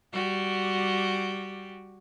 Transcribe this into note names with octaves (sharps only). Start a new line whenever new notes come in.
G3 F#4 G4